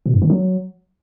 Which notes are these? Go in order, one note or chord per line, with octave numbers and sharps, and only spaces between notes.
B2
G2
D#3
F#3